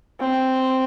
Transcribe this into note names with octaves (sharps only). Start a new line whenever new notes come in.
C4